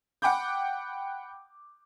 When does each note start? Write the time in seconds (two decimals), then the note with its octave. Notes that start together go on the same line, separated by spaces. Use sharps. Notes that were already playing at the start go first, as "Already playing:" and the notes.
0.22 F#5 G5 B5 D6 G6